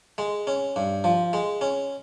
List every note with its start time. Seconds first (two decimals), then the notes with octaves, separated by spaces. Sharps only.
0.18 G#3
0.47 C#4
0.76 G2
1.04 F3
1.33 G#3
1.61 C#4